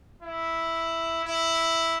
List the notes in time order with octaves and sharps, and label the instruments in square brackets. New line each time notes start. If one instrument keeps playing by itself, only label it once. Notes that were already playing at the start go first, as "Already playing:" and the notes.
[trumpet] E4
E4